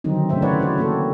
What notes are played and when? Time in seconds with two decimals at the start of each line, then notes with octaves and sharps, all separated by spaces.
0.04 D3 D#3 F#3 C4 D#4
0.29 C#3 A3 D#4 C5 E5
0.42 E4 B4 C#5 D5 F#5
0.60 E4 F#4 C5 C#5
0.78 A#3 C4 F#4 A4